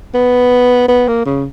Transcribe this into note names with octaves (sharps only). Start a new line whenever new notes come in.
B3
B3
A#3
C#3